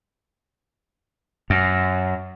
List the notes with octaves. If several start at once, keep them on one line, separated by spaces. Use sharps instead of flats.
F#2